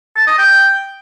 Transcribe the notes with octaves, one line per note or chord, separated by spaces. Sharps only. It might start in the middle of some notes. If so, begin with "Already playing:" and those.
A5
D#5
G5